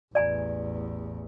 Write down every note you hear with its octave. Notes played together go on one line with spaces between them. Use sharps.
A1 E2 D5 G#5 A#5